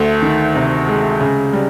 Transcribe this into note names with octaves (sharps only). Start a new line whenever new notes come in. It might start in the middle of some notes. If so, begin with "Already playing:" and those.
Already playing: D2 A3
D#3
C3
G#3
C#3
G3